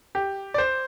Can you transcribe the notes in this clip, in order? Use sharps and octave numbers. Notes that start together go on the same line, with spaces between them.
G4
D5
C5